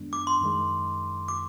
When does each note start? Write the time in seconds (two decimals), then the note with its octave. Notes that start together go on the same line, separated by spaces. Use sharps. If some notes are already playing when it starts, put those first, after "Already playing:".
Already playing: F#2 D#3 G#3 B3 D4
0.13 D6
0.27 C6
0.41 F#2 D#3 G#3
1.28 D6